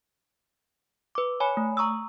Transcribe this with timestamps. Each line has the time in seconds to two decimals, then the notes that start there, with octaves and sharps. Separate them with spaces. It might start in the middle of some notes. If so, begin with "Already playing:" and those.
1.15 B4 D6
1.40 C#5 G#5 B5
1.57 A3
1.77 A#5 C#6 D#6 E6